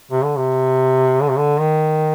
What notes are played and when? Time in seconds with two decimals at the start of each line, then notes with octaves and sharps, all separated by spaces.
0.11 C3
0.24 D3
0.37 C3
1.22 D3
1.30 C3
1.38 D3
1.59 D#3